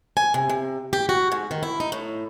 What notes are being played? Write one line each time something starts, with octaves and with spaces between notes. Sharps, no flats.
G#5
C3
C3
G4
F#4
G#2
D#3
E4
D#4
A2